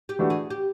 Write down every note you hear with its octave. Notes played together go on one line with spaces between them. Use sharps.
G4
E3 A3 D4 F#4
G#4
G4